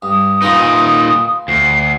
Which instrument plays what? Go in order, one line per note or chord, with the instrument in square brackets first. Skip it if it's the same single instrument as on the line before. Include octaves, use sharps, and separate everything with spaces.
[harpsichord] G2 [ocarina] D#6
[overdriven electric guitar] A#2 D#4 [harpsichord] F4 G#4 B4
[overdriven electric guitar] D2 [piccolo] C7